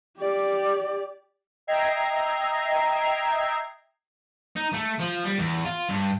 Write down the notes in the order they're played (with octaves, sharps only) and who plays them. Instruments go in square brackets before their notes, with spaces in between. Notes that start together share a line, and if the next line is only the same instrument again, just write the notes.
[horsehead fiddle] G4 D5
[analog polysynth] D#5 E5 G5 A#5 G#6 C7
[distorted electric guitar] D#4
A3
F3
G3
E2
F4
G2